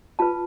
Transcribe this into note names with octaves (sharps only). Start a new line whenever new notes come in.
F4 B4 A5